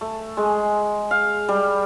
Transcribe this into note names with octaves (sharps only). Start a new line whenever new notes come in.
A3
G#3
F5
G3